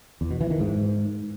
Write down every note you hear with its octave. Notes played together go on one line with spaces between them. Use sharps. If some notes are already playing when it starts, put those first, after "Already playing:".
E2
B2
E3
D#3
G#2